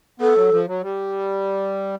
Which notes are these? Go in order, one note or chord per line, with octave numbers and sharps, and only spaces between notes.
B3 A4
F#3
F3
F#3
G3